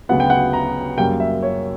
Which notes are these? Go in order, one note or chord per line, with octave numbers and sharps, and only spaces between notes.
D2 C#3 F#3 B3 F#5
G5
F#5
A#5
F#2 C#3 G3 A#3 G5
E5
C#5